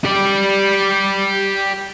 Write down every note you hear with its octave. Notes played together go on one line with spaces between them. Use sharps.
G4 D5